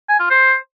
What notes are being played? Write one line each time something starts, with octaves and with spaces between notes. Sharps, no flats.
G#5
F4
C5